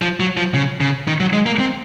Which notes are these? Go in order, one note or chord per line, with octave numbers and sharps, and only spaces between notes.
F3
F#3
F3
C#3
C#3
D#3
F#3
G#3
A#3
C4